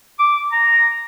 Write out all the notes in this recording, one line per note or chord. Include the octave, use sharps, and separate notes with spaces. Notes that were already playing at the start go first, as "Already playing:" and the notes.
D6
A#5